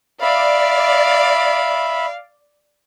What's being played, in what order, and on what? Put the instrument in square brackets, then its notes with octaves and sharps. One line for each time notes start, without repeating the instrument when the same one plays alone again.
[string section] D5 [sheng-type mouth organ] E5 B5 [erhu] F5